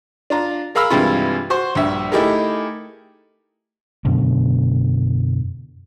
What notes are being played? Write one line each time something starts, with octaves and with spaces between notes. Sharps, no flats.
D4 F4 A#5
G#4 A#4 F5 B5 E6 F6
G2 C3 E3 G#3 E4 F4
F#4 C5 C6
A#1 G2 E5
A3 D#4 E4 G4 G#4 A#4
F#2 B2 D3